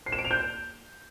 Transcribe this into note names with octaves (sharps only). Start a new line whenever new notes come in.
C7
E7
D7
F7
G6